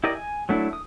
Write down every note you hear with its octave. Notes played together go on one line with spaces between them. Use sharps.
E4 G4 A#4 D5 D#5
G#5
F#3 A3 D4 E4
D#6